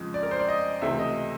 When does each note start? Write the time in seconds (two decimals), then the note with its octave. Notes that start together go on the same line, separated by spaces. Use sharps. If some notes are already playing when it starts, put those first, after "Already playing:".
Already playing: F2 C#3 F3 G#3
0.14 D5
0.23 A#4
0.31 C5
0.39 D5
0.49 D#5
0.82 C#2 C3 E3 A3 C4 E5
0.99 D#5